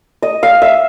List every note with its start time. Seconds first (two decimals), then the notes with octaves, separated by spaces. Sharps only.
0.22 D#5
0.43 F5
0.62 E5